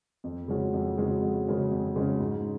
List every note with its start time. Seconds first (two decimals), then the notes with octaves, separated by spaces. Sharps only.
0.24 F2
0.48 C#3 G#3 C#4 F#4
0.73 F2
0.97 C#3 G#3 C#4 F#4
1.22 F2
1.47 C#3 G#3 C#4 F#4
1.71 F2
1.96 C#3 G#3 C#4 F#4
2.20 G#2